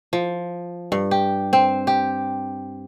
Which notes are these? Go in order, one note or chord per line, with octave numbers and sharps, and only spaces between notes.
F3
G2
G4
C4
G4